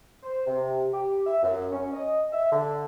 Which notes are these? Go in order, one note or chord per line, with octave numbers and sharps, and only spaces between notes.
C5
C3
G4
E5
F#2
C#4
D#5
E5
D3